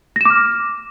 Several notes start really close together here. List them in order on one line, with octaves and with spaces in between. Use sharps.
A#6 E7 D6 F6